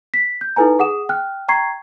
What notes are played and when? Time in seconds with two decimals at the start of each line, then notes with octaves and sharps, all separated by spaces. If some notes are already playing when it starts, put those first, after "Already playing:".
0.14 B6
0.41 G6
0.56 D#4 E4 A4 B4 G#5 A#5
0.79 G#4 F#5 D#6 E7
1.09 G5 F6 F#6
1.48 G5 A#5 C#6 G#6 C7